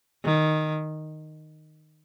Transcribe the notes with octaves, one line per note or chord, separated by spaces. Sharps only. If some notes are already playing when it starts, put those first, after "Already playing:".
D#3